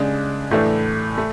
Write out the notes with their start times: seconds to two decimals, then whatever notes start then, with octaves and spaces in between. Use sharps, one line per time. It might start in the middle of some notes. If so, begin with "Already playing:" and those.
Already playing: C#3 G#3 D4
0.51 A2 E3 A3 D4
1.18 A3